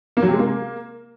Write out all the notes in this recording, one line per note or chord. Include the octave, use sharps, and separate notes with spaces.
A#3
F#3
C3
G#3
A#3